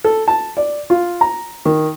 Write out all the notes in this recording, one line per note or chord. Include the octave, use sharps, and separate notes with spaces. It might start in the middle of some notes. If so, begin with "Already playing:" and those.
A4
A5
D5
F4
A#5
D#3